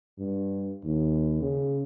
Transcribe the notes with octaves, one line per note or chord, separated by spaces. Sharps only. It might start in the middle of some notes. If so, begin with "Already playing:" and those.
G2
D#2
C#3